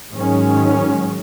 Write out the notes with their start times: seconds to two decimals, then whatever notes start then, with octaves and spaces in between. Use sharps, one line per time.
0.11 G#2 D#3 F#3 G#3 C#4